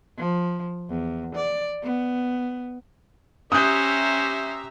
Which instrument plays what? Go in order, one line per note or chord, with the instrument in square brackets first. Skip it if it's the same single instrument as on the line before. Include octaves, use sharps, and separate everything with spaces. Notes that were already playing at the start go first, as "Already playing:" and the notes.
[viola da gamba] F3
E2
D5
B3
[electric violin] C#4 C5 [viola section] G4 E5 A#5 [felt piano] D#6 F#6 G6